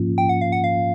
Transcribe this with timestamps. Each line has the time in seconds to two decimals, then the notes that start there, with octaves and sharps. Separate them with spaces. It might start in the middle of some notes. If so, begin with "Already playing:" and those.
Already playing: G#2 F3 A#3 C#4 F4
0.18 G5
0.29 F#5
0.41 F5
0.52 F#5
0.64 F5